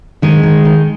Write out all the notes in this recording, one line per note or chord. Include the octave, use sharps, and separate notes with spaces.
D#3 G#3
D#3
D#3